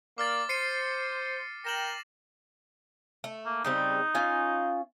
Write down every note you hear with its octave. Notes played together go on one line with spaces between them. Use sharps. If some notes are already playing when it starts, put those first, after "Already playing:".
A#3 D5 D6 F6 A6
C5 C7 C#7 D#7
A#4 G5 A#6 E7 F#7
A3
A#3
C#3 G3 C4 D#4
C#4 F4 G#5